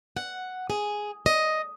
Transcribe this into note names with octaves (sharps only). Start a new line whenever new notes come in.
F#5
G#4
D#5